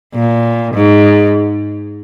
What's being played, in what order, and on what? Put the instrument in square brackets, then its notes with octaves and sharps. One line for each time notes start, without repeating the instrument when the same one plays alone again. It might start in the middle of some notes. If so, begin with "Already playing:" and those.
[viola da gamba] A#2
G#2